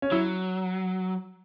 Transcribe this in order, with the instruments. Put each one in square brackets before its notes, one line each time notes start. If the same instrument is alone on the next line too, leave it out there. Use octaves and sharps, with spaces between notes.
[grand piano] C#4
[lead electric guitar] F#3 [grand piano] E4